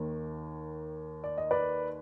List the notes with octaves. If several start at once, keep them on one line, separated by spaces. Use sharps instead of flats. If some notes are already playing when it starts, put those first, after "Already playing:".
Already playing: D#2 D#3
D5
D#5
B4 D5